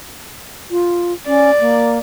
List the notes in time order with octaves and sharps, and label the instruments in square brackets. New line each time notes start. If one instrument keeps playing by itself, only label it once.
[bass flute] F4
[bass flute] C#4 [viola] D5
[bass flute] A#3